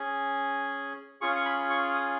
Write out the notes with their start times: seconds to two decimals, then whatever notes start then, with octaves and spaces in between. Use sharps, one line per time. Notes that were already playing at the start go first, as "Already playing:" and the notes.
Already playing: C#4 G#4
1.21 C#4 F4 G#4 C#6
1.36 C#6
1.45 B5
1.70 C#6
1.94 D#6